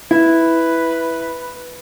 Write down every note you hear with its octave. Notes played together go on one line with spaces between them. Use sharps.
E4 B4